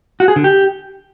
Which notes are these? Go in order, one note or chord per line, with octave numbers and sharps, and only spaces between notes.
F#4
G#4
D3
G4